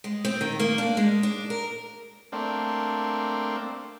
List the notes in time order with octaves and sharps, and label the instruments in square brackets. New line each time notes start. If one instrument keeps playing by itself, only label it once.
[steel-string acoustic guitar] G#3
C4
D#3
A#3
D4
G#3
D4
A#4
[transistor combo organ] A3 A#3 C4 D4